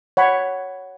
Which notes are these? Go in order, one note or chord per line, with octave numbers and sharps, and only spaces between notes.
C#5 F#5 B5